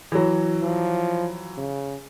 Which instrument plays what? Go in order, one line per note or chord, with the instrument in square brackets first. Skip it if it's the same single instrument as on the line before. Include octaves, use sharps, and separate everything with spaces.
[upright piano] E3 F#3
[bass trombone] F3
C#3